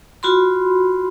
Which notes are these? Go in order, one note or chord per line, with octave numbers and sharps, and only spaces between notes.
F4 F#4 B5 C6